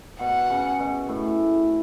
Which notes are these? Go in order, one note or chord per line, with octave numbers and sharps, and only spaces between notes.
B2 F#5
C#3
B2
A2